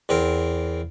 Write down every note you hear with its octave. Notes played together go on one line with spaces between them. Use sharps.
E2 C4 A#4